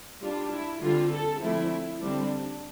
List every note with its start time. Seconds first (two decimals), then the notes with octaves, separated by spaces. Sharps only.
0.21 G3 D4 F4
0.51 E4
0.81 D3 G3 C4 F4
1.11 A4
1.41 D3 F3 A3 C4 E4
2.01 D3 G3 C4 D4